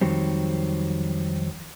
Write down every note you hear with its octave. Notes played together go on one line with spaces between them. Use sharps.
F2 D#3 F#3 G3 C4